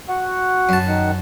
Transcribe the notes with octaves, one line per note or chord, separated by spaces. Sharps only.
F#4 F#5
F#2 A5
D#3 F#5